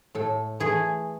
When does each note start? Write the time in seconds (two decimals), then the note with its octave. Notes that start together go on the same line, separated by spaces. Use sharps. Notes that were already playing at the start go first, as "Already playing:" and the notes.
0.15 A2 A4
0.60 E3 A3 G#4